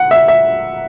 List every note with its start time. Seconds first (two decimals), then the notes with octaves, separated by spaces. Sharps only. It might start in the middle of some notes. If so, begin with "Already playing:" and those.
Already playing: F#5
0.11 E5
0.28 E5